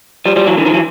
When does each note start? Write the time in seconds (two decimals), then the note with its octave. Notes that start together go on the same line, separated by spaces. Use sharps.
0.25 F3 G3
0.36 F3 G3
0.47 E3 F#3
0.57 D3 E3
0.65 D#3 F3
0.74 E3 F#3